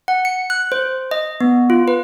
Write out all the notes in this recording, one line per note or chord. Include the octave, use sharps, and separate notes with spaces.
F#5
C#7
F#6
C5
D#5
B3
F4
B4